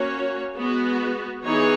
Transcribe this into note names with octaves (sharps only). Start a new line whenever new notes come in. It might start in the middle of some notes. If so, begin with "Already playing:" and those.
Already playing: A#3 C#4 F#4 C#5
G#3 B3 F#4
E3 B3 D#4 G#4 C#5